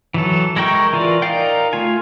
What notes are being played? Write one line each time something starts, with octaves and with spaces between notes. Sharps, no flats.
E3 F#3 A4
G#3 E4 A#4 G5 C#6
E3 F4 A#4 D5
D#4 A#4 D5 F5 G5
A3 F4 G#5